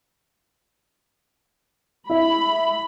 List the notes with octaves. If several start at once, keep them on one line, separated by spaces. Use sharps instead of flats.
E4 B5